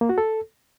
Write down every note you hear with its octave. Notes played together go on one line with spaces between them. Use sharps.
A#3
F#4
A4